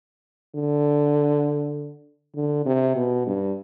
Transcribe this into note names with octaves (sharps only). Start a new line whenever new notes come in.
D3
D3
C3
B2
G2